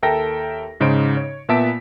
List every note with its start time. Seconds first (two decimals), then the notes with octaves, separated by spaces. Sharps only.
0.02 D#2 A4 A#4 E5 G5 A#6
0.80 G#2 C#3 D#4 C5 D7
1.17 C#5
1.49 A#2 B3 E5 A5 B6 D7